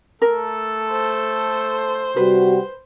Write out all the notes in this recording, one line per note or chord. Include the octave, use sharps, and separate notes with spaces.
A3 A4 A#4
C5
C3 G3 F#4 B4